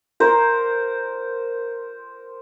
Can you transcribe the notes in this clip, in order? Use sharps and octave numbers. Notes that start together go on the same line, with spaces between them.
A#4 C5